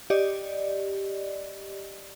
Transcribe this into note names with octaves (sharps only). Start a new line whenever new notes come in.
G4 D5 D#5